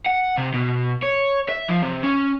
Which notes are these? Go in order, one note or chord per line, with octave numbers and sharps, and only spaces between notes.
F#5
C3
B2
C#5
E5
F3
C3
C#4